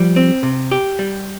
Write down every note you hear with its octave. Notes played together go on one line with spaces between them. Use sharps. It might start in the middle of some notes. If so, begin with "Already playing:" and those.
Already playing: F3 G3
C4
C3
G4
G3